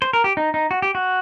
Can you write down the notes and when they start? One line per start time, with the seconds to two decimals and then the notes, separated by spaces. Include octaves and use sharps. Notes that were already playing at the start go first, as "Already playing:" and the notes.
0.02 C5
0.13 A#4
0.24 G4
0.37 D#4
0.54 D#4
0.71 F#4
0.82 G4
0.95 F#4